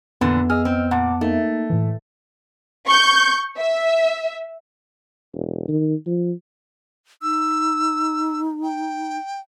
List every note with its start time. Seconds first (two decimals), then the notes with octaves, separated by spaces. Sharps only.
0.21 F2 A#2 D3 E3 B3
0.50 G#4 D#5 E6 F6
0.65 C4
0.91 A#2 F#5 A5 D6
1.21 A3 A#3 D#4
1.70 A2 E3
2.88 C#6 G6
3.57 E5
5.34 E1
5.68 D#3
6.06 F3
7.22 D#4 E6
8.63 G5